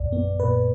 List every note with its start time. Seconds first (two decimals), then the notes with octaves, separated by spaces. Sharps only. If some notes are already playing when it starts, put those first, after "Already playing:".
Already playing: A#1 F#2 D5
0.12 B3
0.40 A#2 B4